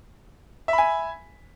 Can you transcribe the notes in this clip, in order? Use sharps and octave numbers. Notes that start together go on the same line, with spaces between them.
E5 G#5 B5